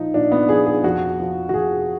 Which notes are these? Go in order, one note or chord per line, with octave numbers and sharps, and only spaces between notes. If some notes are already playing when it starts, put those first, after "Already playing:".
Already playing: A#2 F3 D#4
A#2 D4
B3
F3 G#4
G#4
F2 F#4
F3
F#4
F2 G#4